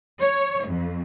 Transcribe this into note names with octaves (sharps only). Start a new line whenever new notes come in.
C#5
F2